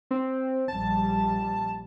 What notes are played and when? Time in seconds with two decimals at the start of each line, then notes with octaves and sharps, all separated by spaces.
0.11 C4
0.68 A#1 G3 A5